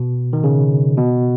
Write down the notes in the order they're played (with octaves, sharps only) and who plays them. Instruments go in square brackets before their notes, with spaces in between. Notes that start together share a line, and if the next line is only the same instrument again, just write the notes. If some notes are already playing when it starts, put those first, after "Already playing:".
Already playing: [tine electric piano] B2
D#3
C#3
B2